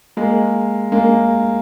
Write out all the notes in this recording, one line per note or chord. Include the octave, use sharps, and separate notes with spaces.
G#3 A#3
G#3 A#3